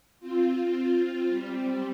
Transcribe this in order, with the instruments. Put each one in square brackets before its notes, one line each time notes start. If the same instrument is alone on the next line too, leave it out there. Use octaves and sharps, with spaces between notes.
[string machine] C4 F4
G3 C4